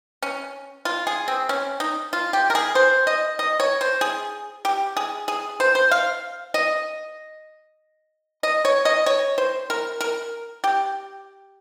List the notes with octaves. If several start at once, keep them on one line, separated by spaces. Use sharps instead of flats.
C#4
F4
G#4
C4
C#4
D#4
F4
G4
A#4
G#4
C5
D#5
D#5
C#5
C5
G#4
G4
G#4
G#4
C5
C5
F5
D#5
D#5
C#5
D#5
C#5
C5
A#4
A#4
G4